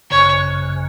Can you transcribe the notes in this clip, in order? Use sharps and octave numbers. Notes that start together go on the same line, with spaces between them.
G#1 F#2 C#3 C#5